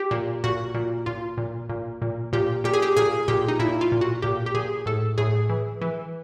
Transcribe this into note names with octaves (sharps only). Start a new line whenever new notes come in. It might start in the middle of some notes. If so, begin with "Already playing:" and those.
Already playing: G4
A#2
A#2 F#4
A#2
A#2 F4
A#2
A#2
A#2
A#2 G4
A#2 G4
G#4
G4
A#2 G#4
A#2 G4
D#4
A#2 E4
F4
A#2
F#4
A#2 G4
G4
A#2 G#4
A2 A4
A2 G#4
E3
E3